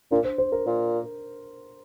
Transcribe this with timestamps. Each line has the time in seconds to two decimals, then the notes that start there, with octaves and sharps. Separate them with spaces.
0.11 A#2 D4
0.24 C5
0.38 C5
0.52 A#4
0.66 A#2